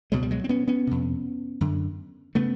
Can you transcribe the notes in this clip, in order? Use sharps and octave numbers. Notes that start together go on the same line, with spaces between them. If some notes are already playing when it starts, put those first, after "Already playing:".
C#2 B2 F#3 G#3
G3
F#3 G#3
C4
B3 C#4
B3 C#4
F2 C3
F#2 D3
C#3 A3 B3